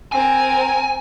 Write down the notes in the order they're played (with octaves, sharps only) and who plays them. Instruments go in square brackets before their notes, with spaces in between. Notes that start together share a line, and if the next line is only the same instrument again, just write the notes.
[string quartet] C4 A#4 [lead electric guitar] G#5